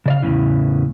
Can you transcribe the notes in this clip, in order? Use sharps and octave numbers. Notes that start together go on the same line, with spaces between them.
C#3 D5 F5
E2 A2 C#3 E3